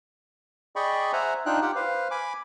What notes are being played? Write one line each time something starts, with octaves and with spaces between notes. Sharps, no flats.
G#4 D5 D#5 G5 B5 C#6
C5 E5 F#5 G#5 A#5
D4 D#4 F4 G5 F#6
F4 G4 F#5 G5
B4 C5 F5
G#5 B5 D6